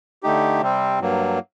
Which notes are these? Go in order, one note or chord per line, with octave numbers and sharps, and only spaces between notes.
D3 A3 D#4 G4
C3 G3 C4
G2 F#3 A#3